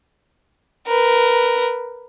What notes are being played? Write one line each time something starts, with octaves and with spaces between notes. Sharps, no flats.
A#4 B4